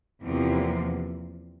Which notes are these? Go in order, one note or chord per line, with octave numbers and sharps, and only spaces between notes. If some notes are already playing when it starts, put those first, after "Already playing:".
E2 C3 F3 A#3